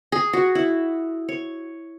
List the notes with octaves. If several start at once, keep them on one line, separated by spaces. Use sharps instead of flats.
G#4
F#4
E4
C#5